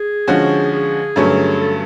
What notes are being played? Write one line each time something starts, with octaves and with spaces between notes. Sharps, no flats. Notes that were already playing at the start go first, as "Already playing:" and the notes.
Already playing: G#4
D3 F3 G#3 C#4 F#4
G#4
G2 D3 F#3 A3 C#4
A4